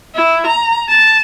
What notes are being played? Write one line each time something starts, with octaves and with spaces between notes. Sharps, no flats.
E4
A#5
A5